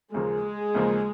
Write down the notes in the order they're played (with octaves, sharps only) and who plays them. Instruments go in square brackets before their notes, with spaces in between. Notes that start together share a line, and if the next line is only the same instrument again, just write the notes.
[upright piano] D#2 C#3 F3 A#3 [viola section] G#3
[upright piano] D#2 C#3 F3 A#3